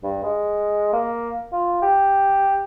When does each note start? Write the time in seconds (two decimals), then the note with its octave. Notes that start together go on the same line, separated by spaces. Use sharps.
0.03 G2
0.23 G#3
0.93 A#3
1.52 F4
1.82 G4